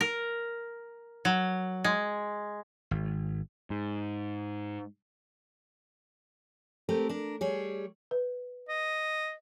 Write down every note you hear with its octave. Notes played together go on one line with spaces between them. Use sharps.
A#4
F#3
G#3
G#1
G#2
A3 C4 G4 A#4
D4 A#4
G3 G#4 C#5
B4
D#5